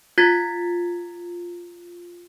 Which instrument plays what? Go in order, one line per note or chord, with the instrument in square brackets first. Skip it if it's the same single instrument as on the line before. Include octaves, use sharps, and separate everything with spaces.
[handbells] F4 G#6 A6 B6